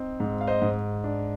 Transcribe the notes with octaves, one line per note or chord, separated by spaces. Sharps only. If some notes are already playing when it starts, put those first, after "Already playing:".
Already playing: C4 D#4
G#2
F5
C5 D#5
G#2
D4